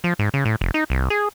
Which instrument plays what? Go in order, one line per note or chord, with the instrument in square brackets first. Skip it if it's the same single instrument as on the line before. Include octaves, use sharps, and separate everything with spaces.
[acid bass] F3
G#2
C#3
A2
F1
D#4
C2
G#4